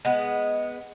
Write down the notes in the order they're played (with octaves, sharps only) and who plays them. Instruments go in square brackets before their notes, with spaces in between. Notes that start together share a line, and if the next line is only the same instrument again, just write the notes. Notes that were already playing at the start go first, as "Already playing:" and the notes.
[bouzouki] G#3 B3